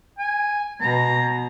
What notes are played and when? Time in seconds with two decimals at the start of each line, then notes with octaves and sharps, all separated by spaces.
0.18 G#5
0.81 B2 A#5